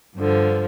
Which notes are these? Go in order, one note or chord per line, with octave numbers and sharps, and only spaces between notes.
G2 D3 F3